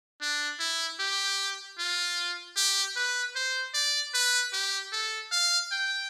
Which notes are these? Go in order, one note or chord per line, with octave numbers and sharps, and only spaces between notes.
D4
E4
G4
F4
G4
B4
C5
D5
B4
G4
A4
F5
G5